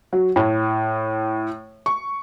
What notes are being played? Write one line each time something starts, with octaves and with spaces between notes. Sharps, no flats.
F#3
A2
C#6